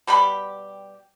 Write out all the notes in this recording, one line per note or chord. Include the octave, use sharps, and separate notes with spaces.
B2 G3 G4 B5